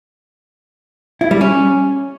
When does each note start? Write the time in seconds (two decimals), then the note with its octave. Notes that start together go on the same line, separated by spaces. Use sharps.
1.21 E4
1.31 G3
1.41 C#4